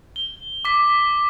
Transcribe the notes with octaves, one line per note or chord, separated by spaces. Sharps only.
G7
D6 B6